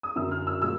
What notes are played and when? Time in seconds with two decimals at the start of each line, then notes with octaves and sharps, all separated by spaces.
0.03 D#6
0.16 F#2 D3 F#3 E6
0.31 F6
0.47 E6
0.62 A#2 G3 E6